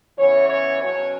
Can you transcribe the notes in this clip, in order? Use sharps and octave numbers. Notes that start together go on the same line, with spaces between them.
C#3 E3 B3 C#5
C#5
B2 F#3 C#4 C#5